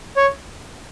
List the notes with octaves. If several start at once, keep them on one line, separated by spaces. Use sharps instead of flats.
C#5